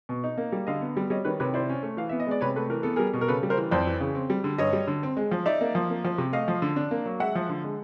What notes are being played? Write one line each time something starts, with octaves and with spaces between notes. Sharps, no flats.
B2
D#4
A#3
G3
D3 D#5 F5
B3
G3
G3 C#5 D#5
D#3 B4 C#5
C3 B4 C#5
E4 C5 D5
C#4
A3
E3 F5
B3 E5
D#5
G#3 D5
C3 B4 C#5
A3 A4 B4
E3 A#4
B3 A4
G3 G#4 A#4
B2
A#4
C#3 A4 B4
G3
A#4 C5
E3
F2 C5 D5
E3
C#3
C4
G3
D3
G2 C#5 D#5
G3
D3
C4
G#3
F3
D#4 D5 E5
A#3
F3
A#3
F3
C3
A3 D#5 F5
F3
D3
D4
A#3
F#3
G#3 E5 F#5
F3
D3
G#3